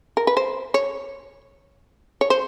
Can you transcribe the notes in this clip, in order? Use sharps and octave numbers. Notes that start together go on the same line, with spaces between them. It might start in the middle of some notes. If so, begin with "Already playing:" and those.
A#4
B4
C5
C#5
C#5
C5